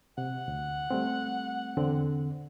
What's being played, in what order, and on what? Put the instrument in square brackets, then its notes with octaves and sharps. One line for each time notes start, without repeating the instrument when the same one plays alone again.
[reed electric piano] C3 [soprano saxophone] F#5
[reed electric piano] D2
G3 A3 C4
E2 D3 C4